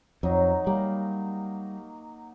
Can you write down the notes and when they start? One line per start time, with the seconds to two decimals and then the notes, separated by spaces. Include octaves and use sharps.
0.23 F2 F#3 D#4
0.67 G3 A#3